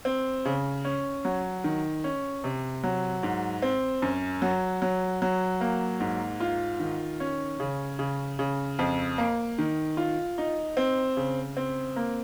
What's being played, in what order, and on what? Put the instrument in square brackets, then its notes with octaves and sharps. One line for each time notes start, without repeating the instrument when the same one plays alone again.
[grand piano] C4
C#3
C#4
F#3
D#3
C#4
C3
F#3
G#2
C4
F#2
F#3
F#3
F#3
A#3
G#2
F4
D#3
C#4
C#3
C#3
C#3
F2
A#3
D#3
F4
D#4
C4
C#3
C4
A#3